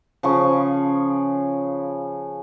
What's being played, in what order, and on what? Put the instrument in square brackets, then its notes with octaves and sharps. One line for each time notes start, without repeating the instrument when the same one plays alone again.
[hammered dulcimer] C#3 F3 G#4 C#6